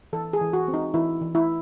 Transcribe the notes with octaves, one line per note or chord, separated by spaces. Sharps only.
E3 A4
G#4
E3
F#4
C4
D#4
E3 E4
E3
E4